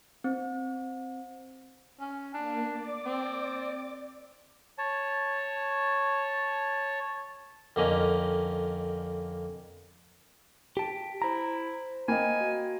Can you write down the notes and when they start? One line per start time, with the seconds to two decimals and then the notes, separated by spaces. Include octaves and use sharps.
0.24 C4
2.00 C#4
2.34 A#3 D4
2.71 D5 D6
3.05 C4
4.78 C#5 A5
7.76 F2 D3 A#3 C#4 D#5
10.77 G4 A5 B6 D7
11.22 E4 C5 A#5
12.08 A#3 D#5 G5 G#5 B5
12.40 F#4